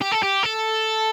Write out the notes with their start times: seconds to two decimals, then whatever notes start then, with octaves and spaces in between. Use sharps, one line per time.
0.02 G4
0.12 A4
0.23 G4
0.43 A4